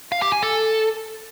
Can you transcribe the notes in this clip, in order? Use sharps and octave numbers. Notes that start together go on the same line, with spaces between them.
F5
G4
G#5
A4